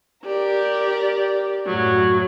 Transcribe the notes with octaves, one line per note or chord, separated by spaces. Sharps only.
G4 A#4 D5
F#2 A2 F#3